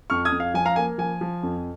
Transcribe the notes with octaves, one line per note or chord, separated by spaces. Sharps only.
F2 C#6 F6
D#6 G#6
F2
F5
F3 G#5
F5 A#5
A#3 G#5
F3 G#5
F3
F2